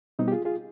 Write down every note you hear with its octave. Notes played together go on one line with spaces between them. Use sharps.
B2 G3 B3 C4 D#4
G4
F4 G#4
F4 G#4